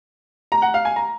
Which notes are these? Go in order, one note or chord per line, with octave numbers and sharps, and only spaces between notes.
A#5
F#5
F5
G#5
A#5